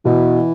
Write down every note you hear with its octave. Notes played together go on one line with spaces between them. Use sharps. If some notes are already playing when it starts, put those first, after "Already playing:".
B2 E3